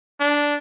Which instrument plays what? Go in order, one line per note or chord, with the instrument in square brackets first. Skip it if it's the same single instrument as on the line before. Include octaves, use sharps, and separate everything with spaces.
[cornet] D4